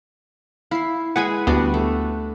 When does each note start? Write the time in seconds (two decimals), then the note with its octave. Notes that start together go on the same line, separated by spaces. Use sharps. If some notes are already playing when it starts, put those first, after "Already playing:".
0.71 E4 F5 C7
1.16 G#3 G#4 B4 F#5 G#5 G#6
1.47 D2 G3 B3 D4 F#4
1.74 A3